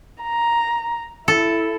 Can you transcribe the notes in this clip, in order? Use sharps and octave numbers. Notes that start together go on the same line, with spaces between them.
A#5
E4 A4